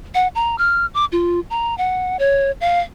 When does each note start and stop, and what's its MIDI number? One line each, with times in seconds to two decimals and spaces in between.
0.15 0.28 78
0.35 0.56 82
0.58 0.86 89
0.94 1.05 86
1.12 1.40 65
1.50 1.76 82
1.78 2.17 78
2.19 2.51 73
2.61 2.80 77